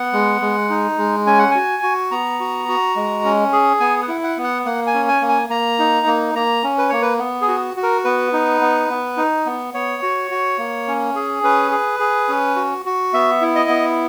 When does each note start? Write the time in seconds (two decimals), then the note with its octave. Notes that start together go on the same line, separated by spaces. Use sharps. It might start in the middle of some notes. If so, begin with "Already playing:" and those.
Already playing: B3 F#5
0.13 G#3
0.41 G#3
0.70 D#4
0.98 G#3
1.26 C#4 G#5
1.39 F#5
1.51 F#4 G#5
1.83 F#4
2.11 B3 A#5
2.40 F#4
2.68 F#4
2.96 G#3
3.25 C#4
3.52 G#4
3.80 B3 G#5
4.02 F#5
4.08 E4
4.24 F#5
4.37 B3
4.44 F#5
4.65 A#3 F#5
4.87 G#5
4.94 C#4
5.08 G#5
5.22 A#3
5.29 G#5
5.50 A#3 A#5
5.79 D#4
6.07 A#3
6.35 A#3 A#5
6.64 C#4
6.78 B4
6.89 A#3 C#5
7.02 B4
7.19 B3
7.42 G#4
7.48 F#4
7.77 F#4
7.83 A#4
8.05 B3 B4
8.33 D#4
8.61 B3
8.90 B3
9.17 D#4
9.46 B3
9.74 B3 C#5
10.03 F#4
10.31 F#4
10.58 A#3
10.88 C#4
11.16 G#4
11.43 C#4 B4
11.71 G#4
12.00 G#4
12.29 C#4
12.56 F#4
12.86 F#4
13.14 B3 E5
13.41 E4
13.55 D#5
13.69 B3